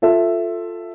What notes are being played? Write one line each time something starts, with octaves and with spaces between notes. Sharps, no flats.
F4 A4 E5